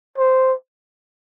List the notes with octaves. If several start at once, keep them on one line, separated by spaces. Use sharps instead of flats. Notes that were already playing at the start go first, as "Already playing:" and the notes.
C5